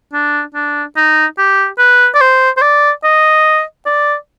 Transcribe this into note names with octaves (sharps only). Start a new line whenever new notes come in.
D4
D4
D#4
G4
B4
D5
C5
C5
D5
D#5
D5